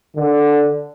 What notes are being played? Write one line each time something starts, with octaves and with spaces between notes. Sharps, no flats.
D3